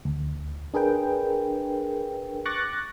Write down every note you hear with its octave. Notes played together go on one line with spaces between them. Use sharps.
D2
D4 G#4 A#4 B4 G5
C#6 D6 F#6 A6 A#6